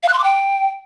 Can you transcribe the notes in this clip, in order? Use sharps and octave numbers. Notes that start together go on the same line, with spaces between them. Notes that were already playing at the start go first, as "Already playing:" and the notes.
F5
F#6
C6
D6
G5